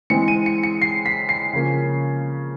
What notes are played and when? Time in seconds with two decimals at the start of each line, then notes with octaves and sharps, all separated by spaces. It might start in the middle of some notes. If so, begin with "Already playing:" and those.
0.10 E3 G#3 C4 C#7
0.28 D#7
0.46 C#7
0.63 C#7
0.82 C7
1.06 B6
1.29 C7
1.53 C#3 F3 A#3 C#4